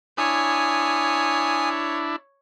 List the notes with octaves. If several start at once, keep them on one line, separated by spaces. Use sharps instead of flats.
D4 E4 C#5 G#5 D#6